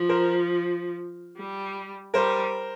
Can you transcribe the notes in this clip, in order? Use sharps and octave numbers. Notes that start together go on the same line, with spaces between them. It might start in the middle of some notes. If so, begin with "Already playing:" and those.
Already playing: F3
A#4 C5
G3
G3 A#4 C5